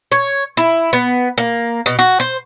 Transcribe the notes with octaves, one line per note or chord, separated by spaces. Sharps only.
C#5
E4
B3
A#3
B2
F#4
C5